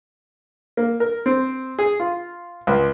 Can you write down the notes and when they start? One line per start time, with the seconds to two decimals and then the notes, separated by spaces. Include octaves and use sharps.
0.77 A#3
1.00 A#4
1.26 C4
1.79 G#4
2.00 F4
2.67 C#2